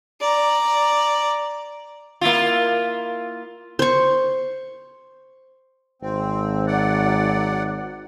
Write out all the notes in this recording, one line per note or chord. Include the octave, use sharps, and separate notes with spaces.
D5 A#5
A#3 E4 F4
C5 C#6
G#1 C4
F#3 D5 F#5